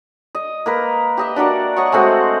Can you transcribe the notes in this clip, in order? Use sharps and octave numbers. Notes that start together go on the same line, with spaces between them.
D#5
A#3 A#4 B4
G4 D#5 E5
D4 F#4 A#4 D5
C#5 D#5 F#5 C#6
G#3 A3 C4 F#4